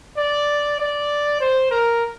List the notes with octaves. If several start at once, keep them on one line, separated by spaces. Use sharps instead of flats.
D5
D5
C5
A#4